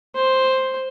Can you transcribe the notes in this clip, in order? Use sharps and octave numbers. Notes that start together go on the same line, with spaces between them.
C5